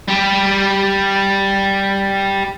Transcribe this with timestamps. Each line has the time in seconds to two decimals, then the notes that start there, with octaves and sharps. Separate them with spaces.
0.08 G3 G4